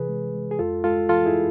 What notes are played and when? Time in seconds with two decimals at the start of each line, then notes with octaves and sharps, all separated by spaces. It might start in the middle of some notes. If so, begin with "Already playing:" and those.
Already playing: C3 E3 G#4 B4
0.09 G#3
0.34 G#3
0.51 G#4
0.59 F2 F4 A4
0.84 G#3 F4 A4
1.09 E3 F4 A4
1.26 E4 G#4